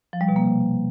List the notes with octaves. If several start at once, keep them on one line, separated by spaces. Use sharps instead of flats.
F3
G3
B2
A#3
C3